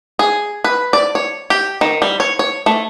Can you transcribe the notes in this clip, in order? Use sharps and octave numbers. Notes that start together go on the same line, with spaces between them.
G#4
B4
D5
C#5
G4
D#3
G3
C#5
C#5
A3